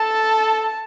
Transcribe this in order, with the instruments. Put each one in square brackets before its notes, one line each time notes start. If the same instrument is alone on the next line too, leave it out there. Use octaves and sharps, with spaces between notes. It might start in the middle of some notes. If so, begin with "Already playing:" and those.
Already playing: [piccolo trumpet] A4 [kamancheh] A5